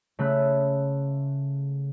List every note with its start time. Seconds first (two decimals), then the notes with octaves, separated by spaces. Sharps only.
0.19 C#3 A3 B5 E6 F#6